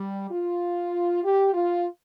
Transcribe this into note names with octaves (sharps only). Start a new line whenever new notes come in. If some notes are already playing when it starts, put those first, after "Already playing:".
Already playing: G3
F4
G4
F4